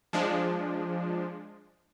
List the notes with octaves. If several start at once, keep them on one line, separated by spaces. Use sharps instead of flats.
F3 G#3 D4